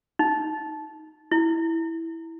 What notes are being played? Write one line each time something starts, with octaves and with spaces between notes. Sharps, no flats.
D#4
E4